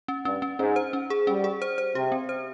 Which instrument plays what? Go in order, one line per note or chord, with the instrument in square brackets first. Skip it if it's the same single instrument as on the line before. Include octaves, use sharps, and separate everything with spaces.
[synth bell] C#4
[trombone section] G2 [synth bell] C#4
[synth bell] C#4
[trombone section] G#2 [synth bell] C#4
[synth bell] C5
C#4
G#4
[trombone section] G3 [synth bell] C#4
[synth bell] G#4
C5
C5
[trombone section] C3 [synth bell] G4
[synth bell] C4
C5